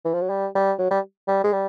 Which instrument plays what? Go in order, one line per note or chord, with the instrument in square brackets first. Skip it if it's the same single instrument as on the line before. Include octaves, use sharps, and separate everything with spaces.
[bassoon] E3
F3
F#3
G3
G3
F#3
G3
G3
G#3
G3